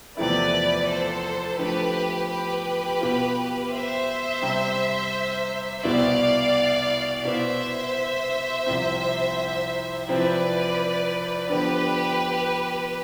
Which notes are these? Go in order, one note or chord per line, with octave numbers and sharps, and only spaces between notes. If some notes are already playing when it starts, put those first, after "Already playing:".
E2 C3 F3 A3 E4 B4 D5
A4 C5
D3 F3 A3 G4 B4
G4 B4
B2 B3 F4
C5 E5
C3 G3 C4
C2 B2 B3 E4 D5 F5
B2 B3 E4 C5 E5
C2 C3 F3 C4
C3 F3 C4 E4 B4 D5
D3 F3 B3 D4 G4 B4